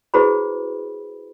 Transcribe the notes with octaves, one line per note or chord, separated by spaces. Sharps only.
E4 F#4 G#4 B4 C5 B5